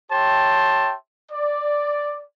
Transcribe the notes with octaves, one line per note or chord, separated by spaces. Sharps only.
G4 C#5 E5 G5 A5 C6
D5